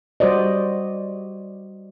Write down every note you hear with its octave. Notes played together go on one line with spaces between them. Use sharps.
G3 F#4 C5 D5 D#5